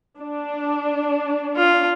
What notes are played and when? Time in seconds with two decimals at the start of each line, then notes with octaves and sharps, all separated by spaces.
0.19 D4
1.57 F4